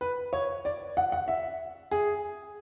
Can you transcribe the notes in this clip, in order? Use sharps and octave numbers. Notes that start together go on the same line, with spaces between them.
B4
C#5
D5
F#5
F#5
E5
G#4